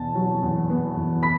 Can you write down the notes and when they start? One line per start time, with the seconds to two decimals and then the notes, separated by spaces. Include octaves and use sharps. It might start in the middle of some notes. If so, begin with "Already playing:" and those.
Already playing: E2 B2 A5
0.15 F#3
0.42 E2
0.70 B3
0.96 E2
1.23 B5 B6